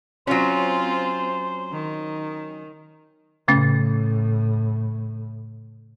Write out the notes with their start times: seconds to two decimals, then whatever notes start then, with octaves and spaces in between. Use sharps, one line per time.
0.27 F#3 C4 C#4 F4 C5
1.72 D#3
3.48 A2 C#3 A3 C#4